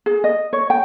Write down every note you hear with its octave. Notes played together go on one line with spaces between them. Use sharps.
G#4
D#5
C#5
G5